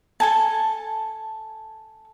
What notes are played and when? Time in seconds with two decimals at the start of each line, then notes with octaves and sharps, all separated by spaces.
0.20 A4 G#5 A5